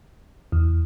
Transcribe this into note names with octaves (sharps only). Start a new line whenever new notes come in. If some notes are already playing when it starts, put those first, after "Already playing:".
E2